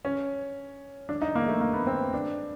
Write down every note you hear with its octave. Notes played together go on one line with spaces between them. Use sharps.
C#4
D4
D#4
A#3
A3
A#3
B3
C4
D4